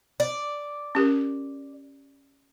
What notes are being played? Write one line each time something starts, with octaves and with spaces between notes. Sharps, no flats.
D5
C#4 G4 A#4